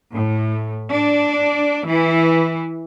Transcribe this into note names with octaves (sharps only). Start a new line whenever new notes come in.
A2
D4
E3